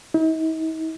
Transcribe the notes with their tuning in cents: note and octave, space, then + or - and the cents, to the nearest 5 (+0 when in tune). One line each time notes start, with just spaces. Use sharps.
D#4 +45